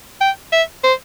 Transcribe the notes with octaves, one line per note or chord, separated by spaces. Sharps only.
G5
E5
C5